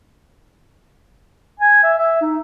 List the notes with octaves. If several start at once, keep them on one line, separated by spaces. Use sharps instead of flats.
G#5
E5
E5
D#4